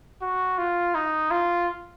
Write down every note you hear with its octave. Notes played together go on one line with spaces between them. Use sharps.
F#4
F4
D#4
F4